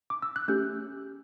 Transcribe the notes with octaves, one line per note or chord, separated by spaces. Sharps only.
D6
E6
F#6
A3 C#4 G4 G6